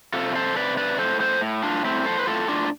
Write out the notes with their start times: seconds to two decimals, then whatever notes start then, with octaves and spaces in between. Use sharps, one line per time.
0.14 C3 F4 A4
0.35 A4 C5
0.56 C3 B4 D5
0.77 B4 D5
0.99 A2 A4 C5
1.20 A4 C5
1.41 A2
1.63 D4 F4
1.84 A2 C4 E4
2.06 A4 C5
2.19 B4
2.27 A2 F4 A4
2.48 D4 F4